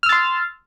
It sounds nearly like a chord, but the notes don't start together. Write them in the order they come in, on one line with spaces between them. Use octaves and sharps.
F6 E6 A6 C6